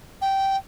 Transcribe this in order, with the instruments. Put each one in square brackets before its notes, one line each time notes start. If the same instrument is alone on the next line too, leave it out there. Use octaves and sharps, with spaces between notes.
[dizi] G5